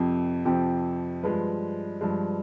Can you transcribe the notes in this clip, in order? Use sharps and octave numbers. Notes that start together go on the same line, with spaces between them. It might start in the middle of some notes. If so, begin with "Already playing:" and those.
Already playing: F2 C3 F3 C4
F2 C3 F3 C4 G4
G2 F3 G#3 B4
G2 F3 G#3